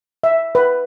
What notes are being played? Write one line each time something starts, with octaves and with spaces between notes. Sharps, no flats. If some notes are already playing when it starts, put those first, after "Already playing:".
E5
B4